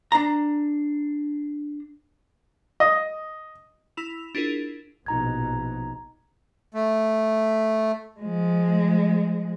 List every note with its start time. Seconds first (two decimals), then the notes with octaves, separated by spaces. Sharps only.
0.12 D4 A#5
2.80 D#5
3.97 E4 B5 E6 E7 F7
4.35 D4 E4 F4 G#4 A#4
5.06 A#1 B2 D#4 A#5 G#6
6.74 A3
8.20 F3 G#3